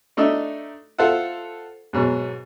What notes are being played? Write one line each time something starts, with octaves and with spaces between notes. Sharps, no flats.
A3 D4 D#4 D#5 E5
F4 A4 C5 E5 F#5
G#2 B2 F#3